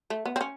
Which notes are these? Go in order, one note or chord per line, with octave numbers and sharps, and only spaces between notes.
A3
B3
C4
C#4